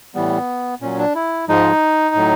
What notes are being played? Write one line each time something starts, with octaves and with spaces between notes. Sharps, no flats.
A2 E3 G3 B3
A#2 F#3 C#4
D4
E4
G#2 F3 G#3 D#4
A2 F#3